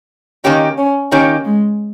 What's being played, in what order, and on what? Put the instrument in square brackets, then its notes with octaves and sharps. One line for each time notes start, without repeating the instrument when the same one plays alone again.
[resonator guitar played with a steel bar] D#3 A#3 D#4 G4 [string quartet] C#4
[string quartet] C#4
[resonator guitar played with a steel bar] D#3 A#3 D#4 G4 [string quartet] C#4
[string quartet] G#3